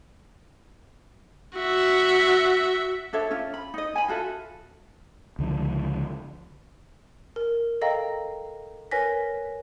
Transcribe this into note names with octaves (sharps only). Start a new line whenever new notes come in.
F#4 E5
D4 A4 C#5 E5
C#4 F4
B5
D#4 D#5
G#5 B5
F4 F#4 A4 E5
C#2 D3 F3
A#4
A4 D#5 F5 G5 A#5
A#4 B4 C#5 G#5 A#6 B6